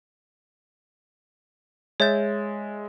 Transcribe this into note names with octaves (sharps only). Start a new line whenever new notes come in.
G#3 C#5 E5 G6 A6